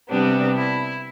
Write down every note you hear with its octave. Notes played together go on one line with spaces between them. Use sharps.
C3 G3 B3 D4
E4